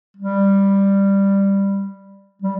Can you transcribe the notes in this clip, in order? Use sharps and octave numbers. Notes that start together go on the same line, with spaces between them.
G3
G3